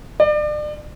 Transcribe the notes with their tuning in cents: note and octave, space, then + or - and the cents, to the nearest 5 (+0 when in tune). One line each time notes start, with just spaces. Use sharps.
D5 +35